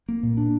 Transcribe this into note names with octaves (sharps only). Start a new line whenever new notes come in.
A#3
A#2
D4